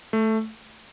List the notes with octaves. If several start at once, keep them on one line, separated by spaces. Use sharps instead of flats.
A3